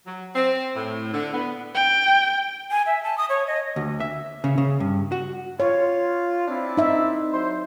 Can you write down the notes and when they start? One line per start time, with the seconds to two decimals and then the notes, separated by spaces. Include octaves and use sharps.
0.07 F#3
0.35 C4
0.76 A2
1.14 D3
1.33 B3
1.75 G5
2.71 G#5
2.86 E5
3.03 A5
3.18 D#6
3.29 C#5
3.47 D#5
3.76 D2
4.00 E5
4.44 C#3
4.58 C#3
4.80 G2
5.12 F#4
5.60 F4 C#5
6.47 C4 D4 E4
6.77 D#4 E5
7.32 F#3 C5